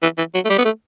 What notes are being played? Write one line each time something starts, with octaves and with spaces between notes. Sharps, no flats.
E3
E3
F#3
A3
G3
B3
A3